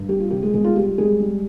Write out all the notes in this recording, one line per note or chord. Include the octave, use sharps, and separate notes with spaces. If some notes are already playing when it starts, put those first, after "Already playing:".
Already playing: G2
G3 G4
F4
C3 G4
G#3 G#4
B2 G#3 G#4
F4
G3 G4
G3 G#3 G#4
G3